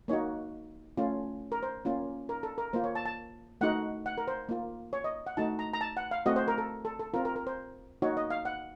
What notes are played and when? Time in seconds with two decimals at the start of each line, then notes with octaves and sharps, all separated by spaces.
0.08 A#3 D#4 F#4 C#5
0.97 A3 C#4 F4
1.52 A#4
1.63 C5
1.85 A#3 C#4 F4
2.29 A#4
2.43 A4
2.58 A#4
2.73 A#3 F4 C5
2.84 C#5
2.95 A5
3.06 A5
3.61 A3 D#4 F#4 F#5
4.06 F#5
4.18 A#4
4.28 C5
4.49 A#3 F4
4.93 C#5
5.04 D#5
5.27 F#5
5.37 A3 D#4 F#4 A5
5.59 A#5
5.74 A#5
5.81 A5
5.97 F#5
6.11 F5
6.26 A3 C4 F#4 D#5
6.36 C5
6.48 A#4
6.58 A4
6.85 A4
6.99 A4
7.14 C4 F4 A#4
7.25 A#4
7.36 A#4
7.47 C5
8.02 A#3 D#4 F#4 C#5
8.17 D#5
8.30 F5
8.45 F#5